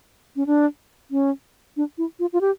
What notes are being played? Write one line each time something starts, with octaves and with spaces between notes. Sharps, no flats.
C#4
D4
C#4
D4
E4
F4
F4
G4